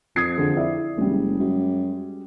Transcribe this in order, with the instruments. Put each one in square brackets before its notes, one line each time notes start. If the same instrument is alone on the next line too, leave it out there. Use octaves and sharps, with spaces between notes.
[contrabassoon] F2 [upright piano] D#6 G#6 C7
[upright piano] D3 G#4
E4 D5 E5
[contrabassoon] F#1 [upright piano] G3 G#3
[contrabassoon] F#2